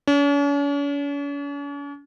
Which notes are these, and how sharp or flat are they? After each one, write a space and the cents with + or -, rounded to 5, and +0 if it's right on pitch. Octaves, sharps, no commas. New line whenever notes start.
C#4 +45